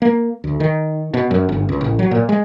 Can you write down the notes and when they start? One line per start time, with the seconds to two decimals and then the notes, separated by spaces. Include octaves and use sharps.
0.02 A#3
0.44 D2
0.60 D#3
1.14 B2
1.31 F#2
1.49 G1
1.69 C#2
1.81 A1
1.99 F#3
2.11 A#2
2.29 G#3